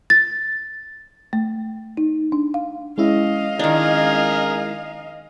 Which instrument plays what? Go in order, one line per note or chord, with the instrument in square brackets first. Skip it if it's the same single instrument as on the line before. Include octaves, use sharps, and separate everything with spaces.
[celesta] A6
[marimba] A3
D#4
D4
F5
[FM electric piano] G#3 C#4 E4 [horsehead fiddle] D#5 F5
[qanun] D#3 D4 [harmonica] G#4 A#4